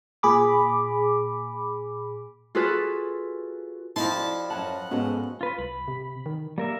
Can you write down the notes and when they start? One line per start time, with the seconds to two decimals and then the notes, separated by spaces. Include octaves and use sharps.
0.23 A#2 G#4 B5 D6
2.55 F4 F#4 G#4 A4 B4
3.96 F2 C4 D#4 E4 A5 B5 C6
4.15 E4 F#4 D5
4.50 F#2 C#5 F#5 A5
4.91 G#2 G#3 B3 C#4 F#4 A4
5.41 F4 B4
5.59 C2 B5
5.88 C3
6.26 D#3
6.58 G3 A#3 A#4 E5